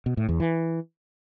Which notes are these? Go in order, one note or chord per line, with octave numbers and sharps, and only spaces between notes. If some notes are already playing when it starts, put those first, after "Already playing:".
B2
A2
E2
E3